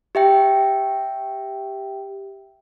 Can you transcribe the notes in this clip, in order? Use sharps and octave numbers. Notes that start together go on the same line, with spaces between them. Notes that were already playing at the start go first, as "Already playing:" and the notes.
G4 E5 G5